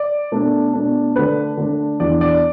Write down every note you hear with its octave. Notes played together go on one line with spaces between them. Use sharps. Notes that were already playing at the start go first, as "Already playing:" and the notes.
Already playing: D5
B2 A3 D4
B2 A3 D4
D3 A3 D4 B4
D3 A3 D4
E2 E3 D4 D5
D5